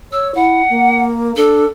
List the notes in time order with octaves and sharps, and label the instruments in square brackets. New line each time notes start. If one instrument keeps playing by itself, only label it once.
[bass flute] C#5 [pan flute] E6
[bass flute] E4 [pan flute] F#5
[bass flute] A#3
[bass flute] D4 [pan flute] A4